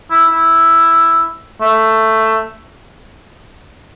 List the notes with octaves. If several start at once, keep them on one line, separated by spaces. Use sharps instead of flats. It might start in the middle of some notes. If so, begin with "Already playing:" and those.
E4
E4
A3